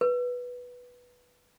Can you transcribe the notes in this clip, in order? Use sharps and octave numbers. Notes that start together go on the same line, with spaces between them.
B4